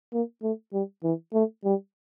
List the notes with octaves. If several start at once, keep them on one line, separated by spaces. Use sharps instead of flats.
A#3
A3
G3
E3
A3
G3